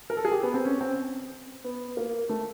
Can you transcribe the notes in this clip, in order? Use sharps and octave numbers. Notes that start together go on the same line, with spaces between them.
A#4
A4
G#4
G4
B3
C4
C#4
C4
B3
A#3
A3